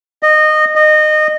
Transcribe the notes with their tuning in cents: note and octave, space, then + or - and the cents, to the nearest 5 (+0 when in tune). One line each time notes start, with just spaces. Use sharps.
D#5 -20
D#5 -25